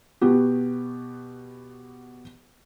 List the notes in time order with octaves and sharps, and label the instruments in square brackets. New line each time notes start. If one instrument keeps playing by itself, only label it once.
[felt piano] B2 B3 F#4 G4